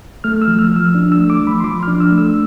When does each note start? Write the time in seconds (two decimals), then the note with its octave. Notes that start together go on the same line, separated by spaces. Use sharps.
0.24 A3 F6
0.42 E6
0.48 F3
0.59 F6
0.72 F3 E6
0.95 D4
1.12 E6
1.18 A3
1.30 D6
1.41 F3
1.47 B5
1.60 C6
1.64 F3 D6
1.83 D4 F6
2.00 E6
2.12 A3
2.18 E6